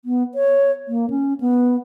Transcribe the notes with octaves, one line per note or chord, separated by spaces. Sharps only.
B3
C#5
A#3
C#4
B3